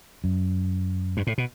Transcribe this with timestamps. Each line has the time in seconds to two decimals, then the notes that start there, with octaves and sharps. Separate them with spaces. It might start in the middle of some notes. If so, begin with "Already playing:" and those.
0.24 F#2
1.17 G2
1.27 A2
1.38 B2